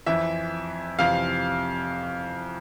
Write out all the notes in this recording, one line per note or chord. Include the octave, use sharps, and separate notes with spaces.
F2 E3 E5
F2 C3 E3 F5